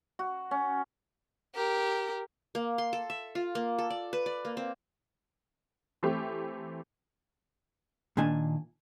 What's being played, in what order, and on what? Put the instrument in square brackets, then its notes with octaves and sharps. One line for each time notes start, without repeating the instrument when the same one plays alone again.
[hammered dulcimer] F#4
C#4
[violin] G4 A#4
[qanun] A#3
C6
A4
E5
F4
A#3
A4
D5
B4
D5
A#3
C4
[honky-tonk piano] E3 A3 C4 G4
[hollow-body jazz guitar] A#2 D#3 D4 G#5